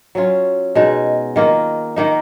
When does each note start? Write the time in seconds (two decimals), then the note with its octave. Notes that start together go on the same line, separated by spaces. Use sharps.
0.15 F#3 C#4 F4
0.75 B2 G#3 D#4
1.36 D#3 A#3 F4
1.96 D#3 A#3 D#4